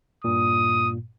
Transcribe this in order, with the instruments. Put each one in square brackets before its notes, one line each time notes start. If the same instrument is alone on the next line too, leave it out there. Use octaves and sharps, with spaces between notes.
[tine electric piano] G2 A#2 [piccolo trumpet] D#6